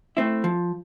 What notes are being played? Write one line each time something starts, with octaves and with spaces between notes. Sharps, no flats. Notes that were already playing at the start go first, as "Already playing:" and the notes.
A3 C4 E4
F3